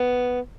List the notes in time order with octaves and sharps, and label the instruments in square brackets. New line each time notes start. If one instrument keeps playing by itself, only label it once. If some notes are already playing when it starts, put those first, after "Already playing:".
Already playing: [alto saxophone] B3